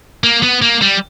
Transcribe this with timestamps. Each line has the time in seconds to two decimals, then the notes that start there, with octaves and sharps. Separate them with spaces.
0.24 A#3
0.43 B3
0.62 A#3
0.82 G3